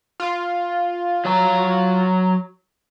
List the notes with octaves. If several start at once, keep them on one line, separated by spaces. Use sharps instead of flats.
F4
F#3 C#5 A#5